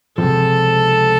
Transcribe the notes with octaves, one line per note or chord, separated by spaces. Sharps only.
C#2 C3 F3 A4